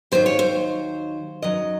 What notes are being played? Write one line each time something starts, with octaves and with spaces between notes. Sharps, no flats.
D#2 D#3 F#3 C5
C#5
C5
F#2 D#3 F#3 D#5